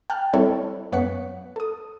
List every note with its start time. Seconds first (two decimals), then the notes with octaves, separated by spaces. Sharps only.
0.10 G5 A5 F6 F#6
0.33 G3 C4 E4 A4 C#5
0.92 F#2 B3 C#5 F#5 B6 C#7
1.56 A4 D#6